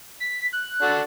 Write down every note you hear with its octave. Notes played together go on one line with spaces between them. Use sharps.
B6
F#6
D4 F#4 A4